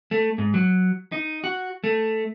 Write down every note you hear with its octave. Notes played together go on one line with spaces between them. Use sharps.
A3
G#2
F#3
D#4
F#4
A3